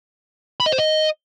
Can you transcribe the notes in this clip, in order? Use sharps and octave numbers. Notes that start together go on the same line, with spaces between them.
B5
D#5
C5
D#5